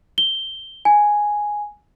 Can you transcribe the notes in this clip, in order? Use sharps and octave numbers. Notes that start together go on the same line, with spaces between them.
G7
G#5